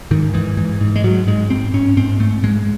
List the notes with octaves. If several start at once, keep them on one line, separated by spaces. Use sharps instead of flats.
G#2 D#3
G#2 E3
G#2 E3
G#2
G#3
G#2 F#3
G#2 G#3
G#2 C4
G#2 C#4
G#2 C4
G#2 A3
G#2 G#3